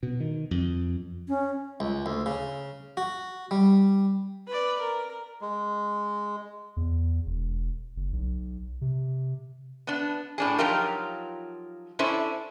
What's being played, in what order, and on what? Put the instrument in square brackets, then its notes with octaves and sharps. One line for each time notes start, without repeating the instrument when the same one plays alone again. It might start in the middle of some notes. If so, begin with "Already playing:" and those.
[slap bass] B2
D#3
F2
[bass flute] C#4
[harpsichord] C#2
D2
C#3
F#4
G3
[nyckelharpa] B4 D5
A#4
[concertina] G#3
[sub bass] E2
E1
F#1
B1
C3
[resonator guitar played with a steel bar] B3 D4
A2 D4 G#4
F3 F#3 D#4 F4 G4 A#4
C#4 D4 E4 A4 C5